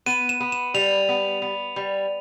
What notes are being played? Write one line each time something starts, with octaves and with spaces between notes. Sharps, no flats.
B3 D#7
E7
B3
E7
G3 F7
B3
B3
G3